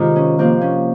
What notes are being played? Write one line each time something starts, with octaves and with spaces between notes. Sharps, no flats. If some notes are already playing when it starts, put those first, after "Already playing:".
Already playing: C3 D#3 G#3 F4
C#4
C3 F3 A#3 C4
C#4